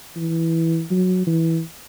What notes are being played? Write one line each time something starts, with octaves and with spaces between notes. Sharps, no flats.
E3
F#3
E3